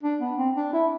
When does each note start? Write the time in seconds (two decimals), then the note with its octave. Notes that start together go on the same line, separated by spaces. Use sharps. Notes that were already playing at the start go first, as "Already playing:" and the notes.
0.03 D4
0.20 B3
0.38 C4
0.56 D4
0.73 E4